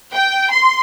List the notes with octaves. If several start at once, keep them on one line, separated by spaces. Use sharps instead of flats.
G5
C6